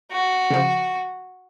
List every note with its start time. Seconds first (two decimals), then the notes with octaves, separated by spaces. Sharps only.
0.11 F#4
0.50 C#3 F3